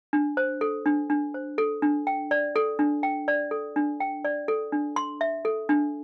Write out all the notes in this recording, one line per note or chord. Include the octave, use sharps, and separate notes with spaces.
D4
C5
A4
D4
D4
C5
A4
D4
G5
D5
A4
D4
G5
D5
A4
D4
G5
D5
A4
D4
C6
E5
A4
D4